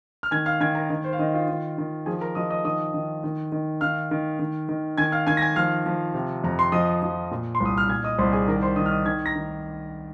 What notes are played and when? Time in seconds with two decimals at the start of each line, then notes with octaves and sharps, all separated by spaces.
0.23 F6
0.31 D#3 G#5 G#6
0.46 F5 F6
0.60 D#3 G#5 G#6
0.75 A#4 A#5
0.90 D#3 D#5
1.04 C5
1.13 F5
1.19 D#3 D#5
1.33 F4 F5
1.48 D#3
1.78 D#3
2.06 F3 G#4 G#5
2.21 A#4 A#5
2.35 F3 D#5 D#6
2.50 D#5 D#6
2.65 D#3 D#5 D#6
2.94 D#3
3.24 D#3
3.52 D#3
3.81 D#3 F5 F6
4.11 D#3
4.39 D#3
4.69 D#3
4.98 D#3 G#5 G#6
5.12 F5 F6
5.27 D#3 G#5 G#6
5.37 A#6
5.41 G#5 G#6
5.56 F3 F5 F6
5.86 F3
6.14 C3
6.44 F2 A#5
6.59 C6
6.72 F3 D#5 D#6
7.02 F3
7.31 A#2
7.55 C6
7.60 C2
7.66 D#6
7.78 F6
7.89 A#2 G#5 G#6
8.04 D#5 D#6
8.18 C2 C5 C6
8.33 G#4 G#5
8.48 D#3 A#4 A#5
8.62 C5 C6
8.76 D#3 D#5 D#6
8.86 F6
8.91 D#5 D#6
9.05 D#3 G#5 G#6
9.26 A#5 A#6
9.36 D#3